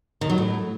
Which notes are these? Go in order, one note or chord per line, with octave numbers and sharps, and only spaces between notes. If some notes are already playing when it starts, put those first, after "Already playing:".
D#3
F#3
A2